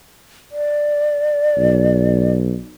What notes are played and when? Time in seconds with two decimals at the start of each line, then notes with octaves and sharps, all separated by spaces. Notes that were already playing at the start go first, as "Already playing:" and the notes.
0.52 D5
1.58 B1